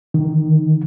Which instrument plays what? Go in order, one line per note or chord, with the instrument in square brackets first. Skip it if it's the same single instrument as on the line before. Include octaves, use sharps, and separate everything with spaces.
[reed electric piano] D#3